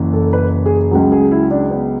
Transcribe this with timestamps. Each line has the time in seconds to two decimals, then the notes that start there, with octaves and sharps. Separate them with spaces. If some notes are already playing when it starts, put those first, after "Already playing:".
Already playing: F#1 F#2 E3
0.13 A4
0.33 B4
0.66 G#4
0.91 C#2 C#3 F#3 G#4
1.12 G#4
1.31 E4
1.51 D4
1.70 B3